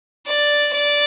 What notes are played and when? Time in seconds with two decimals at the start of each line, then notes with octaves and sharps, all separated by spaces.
0.26 D5
0.73 D5